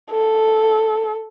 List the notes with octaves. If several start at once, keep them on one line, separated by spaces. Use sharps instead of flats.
A4